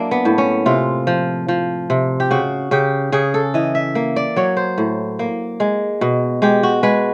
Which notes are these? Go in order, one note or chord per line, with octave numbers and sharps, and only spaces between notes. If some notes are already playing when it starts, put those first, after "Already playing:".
Already playing: F#3 A#3 D4 E4
B3
A2
C#4
C3 F4
F3
F3
C3
G4
C#3 F#4
C#3 G4
C#3 G#4
A4
E3 D#5
E5
A#3
D5
F#3 C#5
C5
A2
A#3
G#3
B2
G#3 G4
F#4
G#3 B4